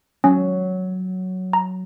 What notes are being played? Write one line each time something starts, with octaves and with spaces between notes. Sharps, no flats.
F#3 C#4
A#5